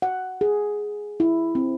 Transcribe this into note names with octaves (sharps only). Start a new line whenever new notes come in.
F#5
G#4
E4
C4